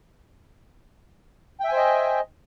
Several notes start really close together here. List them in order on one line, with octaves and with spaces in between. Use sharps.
G5 E5 G#5 C5 D#5